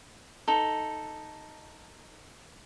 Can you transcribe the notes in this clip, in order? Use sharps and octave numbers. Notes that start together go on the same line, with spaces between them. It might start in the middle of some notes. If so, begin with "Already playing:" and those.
D#4 A4